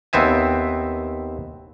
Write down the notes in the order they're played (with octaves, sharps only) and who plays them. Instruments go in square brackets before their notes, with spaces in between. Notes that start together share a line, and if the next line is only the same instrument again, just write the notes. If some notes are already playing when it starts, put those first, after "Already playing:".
[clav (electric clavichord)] D#2 B3 C4 E5 G#5